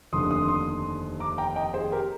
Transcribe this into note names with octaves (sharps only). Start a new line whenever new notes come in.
F1 D#2 D3 C6 D#6
C6 D#6
C6 D#6
A#5 D6
G5 A#5
D#5 G5
G#4 C5
G4 A#4